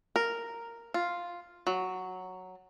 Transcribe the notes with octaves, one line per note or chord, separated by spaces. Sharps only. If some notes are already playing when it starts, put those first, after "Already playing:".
A#4
F4
F#3